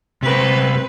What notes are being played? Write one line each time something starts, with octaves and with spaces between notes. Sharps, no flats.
C3 C4 A#4 B4